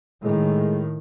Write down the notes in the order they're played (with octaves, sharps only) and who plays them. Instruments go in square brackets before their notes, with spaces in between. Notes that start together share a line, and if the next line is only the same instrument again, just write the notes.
[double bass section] A2 D#3 [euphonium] G#3